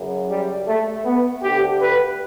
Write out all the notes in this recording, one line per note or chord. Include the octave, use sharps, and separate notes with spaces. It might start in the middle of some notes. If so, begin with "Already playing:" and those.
Already playing: F#2 C#3 E3
G3
A3
B3
D2 D3 G4
B4